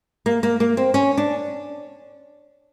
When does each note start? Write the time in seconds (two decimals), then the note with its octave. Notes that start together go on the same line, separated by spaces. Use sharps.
0.26 A#3
0.43 A#3
0.60 A#3
0.77 C4
0.94 C#4
1.18 D4